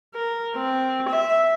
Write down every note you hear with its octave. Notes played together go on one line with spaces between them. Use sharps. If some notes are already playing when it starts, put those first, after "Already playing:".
A#4
C4
E5